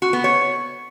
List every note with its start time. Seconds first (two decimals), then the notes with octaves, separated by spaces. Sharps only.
0.02 F#4
0.13 B3
0.24 C#5